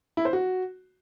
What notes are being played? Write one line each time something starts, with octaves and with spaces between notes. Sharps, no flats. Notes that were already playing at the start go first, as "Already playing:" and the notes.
E4
C5
F#4